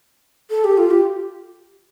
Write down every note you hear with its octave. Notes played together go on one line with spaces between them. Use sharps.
A4
G4
F4
G4